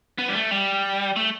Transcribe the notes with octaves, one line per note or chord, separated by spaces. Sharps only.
B3
G3
A3
G3
A3